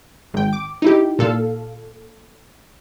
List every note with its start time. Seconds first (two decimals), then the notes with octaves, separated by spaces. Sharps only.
0.34 G#1 G5
0.53 D6
0.82 D#4 E4 G4
1.19 A#2 A4 F5